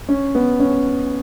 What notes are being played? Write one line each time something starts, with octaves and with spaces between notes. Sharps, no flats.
C#4
B3
C#4